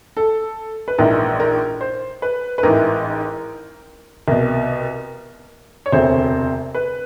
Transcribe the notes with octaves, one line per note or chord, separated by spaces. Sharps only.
A4
B4
A#1 G#2 E3 A#4
A#4
C5
B4
B4
A1 G#2 E3 A#4
C2 B2 A#4
C#5
E1 D2 C3 C5
B4